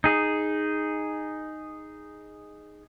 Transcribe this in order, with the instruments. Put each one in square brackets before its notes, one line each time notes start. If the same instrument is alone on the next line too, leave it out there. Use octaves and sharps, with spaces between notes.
[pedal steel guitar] D#4 G#4